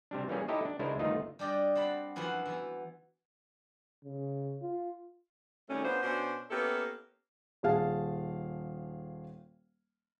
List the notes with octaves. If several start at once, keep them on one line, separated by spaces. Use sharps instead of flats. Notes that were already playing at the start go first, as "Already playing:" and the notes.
C3 G3 D4
E3 G3 A#3 C#4 G#4
D#4 E4 G4 A4 D#5
D4
C#2 G#3 D4 E4 A#4 C5
G1 D#3 A3 D#4 F4 D#5
G3 D4 G4 D5 D#5
C4 F#5 A5 B5
F#2 E3 F3 B4 F#5 C6
E3 B3
C#3
F4
D#3 F#3 G3 A3 C#4
B3 C#4 D4 F4 C5
B2 C#4 D4 C5
A#3 B3 C#4 E4 G4 A4
D#1 G#4 F5 A5